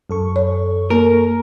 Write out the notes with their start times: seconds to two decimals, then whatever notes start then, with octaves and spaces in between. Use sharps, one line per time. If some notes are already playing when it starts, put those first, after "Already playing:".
0.10 F#2 A4 C#6
0.36 C#5
0.90 A#3 A#4